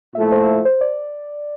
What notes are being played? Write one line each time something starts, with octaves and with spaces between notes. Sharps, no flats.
A#2 F3 A3 E4 E5
C5
C5
D5